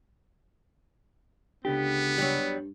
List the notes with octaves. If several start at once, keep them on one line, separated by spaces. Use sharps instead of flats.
C#2 D3 B3 G4
G2 F#3 G3